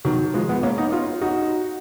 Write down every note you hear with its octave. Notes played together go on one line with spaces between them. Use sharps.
D#3 F#3
F3 G#3
G#3 B3
A#3 C#4
B3 D#4
C#4 F4
D#4 F#4